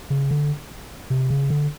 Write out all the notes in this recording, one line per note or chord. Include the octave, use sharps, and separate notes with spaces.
C#3
D3
C3
C#3
D3